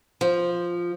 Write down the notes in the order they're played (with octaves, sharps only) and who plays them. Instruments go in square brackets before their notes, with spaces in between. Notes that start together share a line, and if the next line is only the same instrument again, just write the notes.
[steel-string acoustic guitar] F3